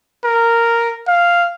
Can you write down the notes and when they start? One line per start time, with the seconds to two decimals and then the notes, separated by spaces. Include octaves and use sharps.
0.24 A#4
1.08 F5